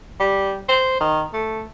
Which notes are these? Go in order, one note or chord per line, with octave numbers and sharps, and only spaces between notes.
G3
C5
D#3
A3